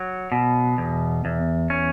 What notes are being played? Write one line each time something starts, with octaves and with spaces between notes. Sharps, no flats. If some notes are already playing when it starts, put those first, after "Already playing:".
Already playing: F#3
B2
E2
E2
C#4